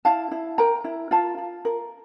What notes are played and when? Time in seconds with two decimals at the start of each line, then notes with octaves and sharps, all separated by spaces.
0.05 E4 F5 A5
0.31 E4
0.58 A#4 G5 A#5
0.84 E4
1.11 F4 F5 A5
1.38 F4
1.65 A#4